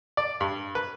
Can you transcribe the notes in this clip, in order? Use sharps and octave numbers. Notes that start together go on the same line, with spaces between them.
D5
G2
B4